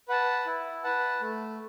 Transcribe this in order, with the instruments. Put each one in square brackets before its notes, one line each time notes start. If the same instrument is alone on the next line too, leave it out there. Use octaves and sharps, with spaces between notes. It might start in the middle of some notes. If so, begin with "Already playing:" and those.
[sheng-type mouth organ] B4 F#5 A5
E4
B4 F#5 A5
A3